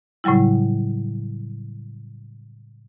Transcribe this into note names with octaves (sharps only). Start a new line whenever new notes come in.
A2 C#3 F#3 G3 E4